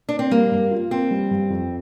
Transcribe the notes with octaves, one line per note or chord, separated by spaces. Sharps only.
D4
C4
G3 A#3
G2
F4
A#3 C4
G3
G2
F2